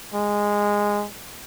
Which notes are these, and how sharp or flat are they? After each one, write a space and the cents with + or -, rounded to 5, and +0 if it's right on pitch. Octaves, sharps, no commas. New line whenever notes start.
G#3 -10